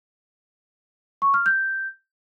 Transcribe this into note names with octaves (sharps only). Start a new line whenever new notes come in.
C#6
F6
G6